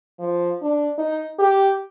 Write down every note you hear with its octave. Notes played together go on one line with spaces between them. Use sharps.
F3
D4
D#4
G4